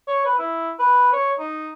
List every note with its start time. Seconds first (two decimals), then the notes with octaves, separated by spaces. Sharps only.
0.08 C#5
0.26 B4
0.39 E4
0.80 B4
1.13 C#5
1.39 D#4